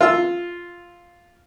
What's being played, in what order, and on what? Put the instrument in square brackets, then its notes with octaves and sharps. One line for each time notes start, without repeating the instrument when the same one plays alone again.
[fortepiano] F4 E6